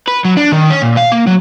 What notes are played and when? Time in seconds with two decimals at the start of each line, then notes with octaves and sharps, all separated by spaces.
0.08 B4
0.25 F#3
0.37 D4
0.52 D#3
0.70 C#4
0.82 A#2
0.97 F5
1.12 A#3
1.27 F#3